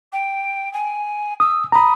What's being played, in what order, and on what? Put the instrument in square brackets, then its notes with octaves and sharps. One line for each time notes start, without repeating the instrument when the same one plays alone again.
[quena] G5
G#5
[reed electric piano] D#6 [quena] E6
[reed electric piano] A#5 B5 [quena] D#6